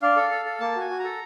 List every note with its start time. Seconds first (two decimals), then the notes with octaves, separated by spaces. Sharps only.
0.02 D4 F5
0.16 A4
0.31 A4
0.45 A4
0.60 A#3 A5
0.76 F#4 G#5
0.90 F#4
0.99 A4 A#5